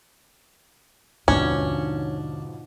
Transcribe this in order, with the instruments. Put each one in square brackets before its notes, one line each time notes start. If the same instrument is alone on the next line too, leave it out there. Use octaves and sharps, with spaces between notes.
[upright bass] D#2 D3 [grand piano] G#2 B2 F3 [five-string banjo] C#4 [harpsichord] D4